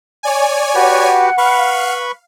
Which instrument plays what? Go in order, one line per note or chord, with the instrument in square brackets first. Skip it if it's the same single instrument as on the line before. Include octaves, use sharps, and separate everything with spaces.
[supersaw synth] C#5 D5 G#5
[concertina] F#4 G4 B4 [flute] F#5
[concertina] B4 B5 C#6 [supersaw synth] F5